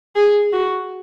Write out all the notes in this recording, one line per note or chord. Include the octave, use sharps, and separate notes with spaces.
G#4
F#4